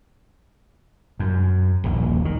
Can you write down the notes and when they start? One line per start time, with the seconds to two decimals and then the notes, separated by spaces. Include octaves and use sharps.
1.19 F#2
1.84 D#1 A#1
2.25 D#3